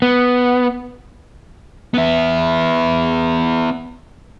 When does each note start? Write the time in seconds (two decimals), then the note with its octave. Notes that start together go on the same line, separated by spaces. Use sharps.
0.02 B3
1.94 B3 E4